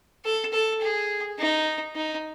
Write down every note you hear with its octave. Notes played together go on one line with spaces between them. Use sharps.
A4
A4
G#4
D#4
D#4